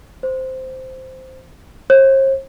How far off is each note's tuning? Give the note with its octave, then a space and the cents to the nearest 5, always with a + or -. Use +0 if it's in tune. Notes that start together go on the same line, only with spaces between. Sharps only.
C5 -5
C5 +45